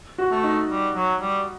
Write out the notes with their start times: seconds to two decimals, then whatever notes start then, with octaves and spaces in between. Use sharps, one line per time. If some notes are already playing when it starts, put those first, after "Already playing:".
0.18 F#4
0.31 A3
0.44 D#4
0.69 G3
0.95 F#3
1.21 G3